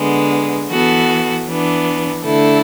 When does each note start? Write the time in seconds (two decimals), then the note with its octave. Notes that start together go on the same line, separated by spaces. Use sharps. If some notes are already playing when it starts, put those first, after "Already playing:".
Already playing: D3 G#3 B3
0.69 E3 B3 F#4 A4
1.47 E3 B3 D4
2.24 D3 A3 E4 A4